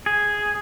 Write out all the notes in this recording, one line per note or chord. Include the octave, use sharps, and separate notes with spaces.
G#4